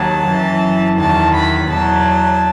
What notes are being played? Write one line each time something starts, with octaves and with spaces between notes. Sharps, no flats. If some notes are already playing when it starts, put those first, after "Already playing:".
Already playing: D#2 D#3 F#3 A5
F#2 E3
E2 D#3 F#3 A5
B5
E2 B2 F#3 A5